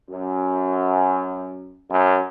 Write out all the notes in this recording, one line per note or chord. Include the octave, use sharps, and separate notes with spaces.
F#2
F#2